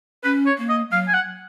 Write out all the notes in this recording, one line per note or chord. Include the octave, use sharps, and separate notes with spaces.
C#4 B4
C#5
A#3
D#5
F#3 F5
G#5
F#5